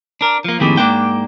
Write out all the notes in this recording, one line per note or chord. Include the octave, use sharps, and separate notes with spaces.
D4 A#4
F3 A#3
F2 A2 D#3 A#3 G4 G#4
G#2 A#3 D4 G5